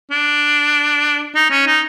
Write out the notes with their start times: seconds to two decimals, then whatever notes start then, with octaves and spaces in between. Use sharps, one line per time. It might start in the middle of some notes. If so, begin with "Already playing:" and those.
0.11 D4
1.35 D#4
1.50 C#4
1.67 D#4